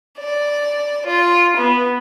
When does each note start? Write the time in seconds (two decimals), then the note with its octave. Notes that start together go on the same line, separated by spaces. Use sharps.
0.18 D5
1.06 F4
1.55 B3